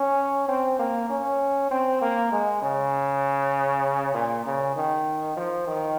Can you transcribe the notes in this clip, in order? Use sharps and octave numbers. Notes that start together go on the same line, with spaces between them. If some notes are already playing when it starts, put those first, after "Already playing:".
Already playing: C#4
C4
A#3
C#4
C4
A#3
G#3
C#3
A#2
C#3
D#3
F3
D#3